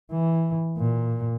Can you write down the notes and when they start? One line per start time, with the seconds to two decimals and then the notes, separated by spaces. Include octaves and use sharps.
0.12 E3
0.78 A#2